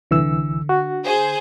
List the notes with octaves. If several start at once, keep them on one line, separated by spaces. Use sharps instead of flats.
C2 D3 E3 E6
F#4
G#4 C5